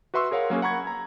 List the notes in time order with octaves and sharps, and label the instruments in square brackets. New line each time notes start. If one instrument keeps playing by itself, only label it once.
[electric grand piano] F#4 B4 E5 C6 C#6 E6
G#4 A#4 C#5 F5 F#5
F#3 A#3 C#4 F#4 G#4
F#5 A#5 B5 C#6 G#6
A#5